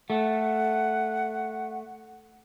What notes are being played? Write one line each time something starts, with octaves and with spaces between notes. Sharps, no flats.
A3 F#5